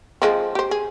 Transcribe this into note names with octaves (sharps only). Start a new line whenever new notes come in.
F3 G#3 C4
G4 C5
G#4